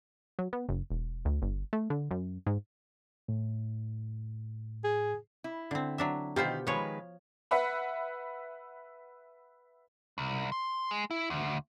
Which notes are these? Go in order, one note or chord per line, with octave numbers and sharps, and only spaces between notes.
F#3
B3
F#1
E1
D2
G1
A3
D3
F#2
G#2
A2
G#4
E4
D3 C4
F#3 D4 E5
B2 D#3 F4 G4 C5
D#3 F3 G#3 B4 C#5
B4 E5 F#5 B5
C2
C6
G#3
E4
D2